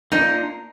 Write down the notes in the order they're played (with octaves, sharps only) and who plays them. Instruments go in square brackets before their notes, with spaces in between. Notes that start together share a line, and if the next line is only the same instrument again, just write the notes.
[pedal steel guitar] A#3 D4 F4 A#4 [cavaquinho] D#4 D#5